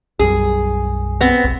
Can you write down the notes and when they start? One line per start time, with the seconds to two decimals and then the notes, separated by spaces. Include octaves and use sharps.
0.19 B1 F#2 G3 G#4
1.21 B3 C4
1.44 F1 B1